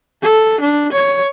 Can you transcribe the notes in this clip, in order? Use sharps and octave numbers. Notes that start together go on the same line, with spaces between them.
A4
D4
C#5